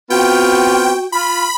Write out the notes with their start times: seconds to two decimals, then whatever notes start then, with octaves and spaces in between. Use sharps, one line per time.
0.10 B3 C4 F4 F#4 G5
1.12 F4 B5